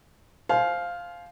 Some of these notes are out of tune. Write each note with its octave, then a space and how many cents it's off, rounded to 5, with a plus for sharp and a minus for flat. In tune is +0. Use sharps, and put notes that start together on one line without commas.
C5 +0 F5 +0 G#5 +45